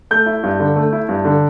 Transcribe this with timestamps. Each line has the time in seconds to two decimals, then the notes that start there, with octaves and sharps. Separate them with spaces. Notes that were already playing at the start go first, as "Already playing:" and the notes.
0.11 A3 G6
0.26 E4
0.43 G2
0.59 D3
0.76 A3
0.93 E4
1.09 G2
1.25 D3